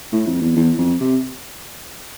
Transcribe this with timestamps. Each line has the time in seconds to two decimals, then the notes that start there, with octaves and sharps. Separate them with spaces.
0.12 A2
0.27 F2
0.41 E2
0.56 E2
0.78 F2
1.00 C3